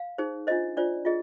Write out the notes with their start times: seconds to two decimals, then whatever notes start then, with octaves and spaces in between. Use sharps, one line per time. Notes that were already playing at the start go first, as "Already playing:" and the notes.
Already playing: F5
0.18 D#4 G#4 C5
0.47 D4 F4 C5 D#5
0.77 D4 F4 C5 D5
1.05 F4 G#4 D#5